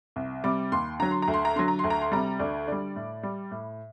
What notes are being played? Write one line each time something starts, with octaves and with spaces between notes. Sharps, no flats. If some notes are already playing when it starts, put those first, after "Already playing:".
C2
C3 G3 D6
D#2 C6
D3 F#3 A#5
C6
A#5
D2
C6
A#5
D3 F#3 C6
A#5
D2 C6
A#5
C6
C3 G3 A#5
D2 D5
D3 G3 D5
A2
G3
A2